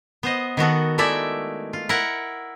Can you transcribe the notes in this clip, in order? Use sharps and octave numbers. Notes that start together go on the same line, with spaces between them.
B3 C5 D#5
D#3 B3 F#4 A4
D#3 G#3 A3 E4 D5 E5
F4
E4 A#4 F#5